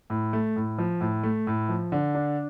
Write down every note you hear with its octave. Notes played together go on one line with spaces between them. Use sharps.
A2
A3
A2
F3
A2
A3
A2
F3
D3
D4